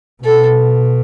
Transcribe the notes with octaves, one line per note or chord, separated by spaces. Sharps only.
B2 A4